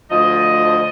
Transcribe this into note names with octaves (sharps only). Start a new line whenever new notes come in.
D2 F3 D#5